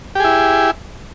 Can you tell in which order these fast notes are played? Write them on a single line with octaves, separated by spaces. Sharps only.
G4 G#4 E4